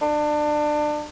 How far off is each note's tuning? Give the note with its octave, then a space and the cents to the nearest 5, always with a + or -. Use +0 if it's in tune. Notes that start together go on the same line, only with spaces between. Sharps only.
D4 +25